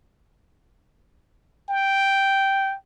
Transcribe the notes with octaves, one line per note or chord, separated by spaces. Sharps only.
G5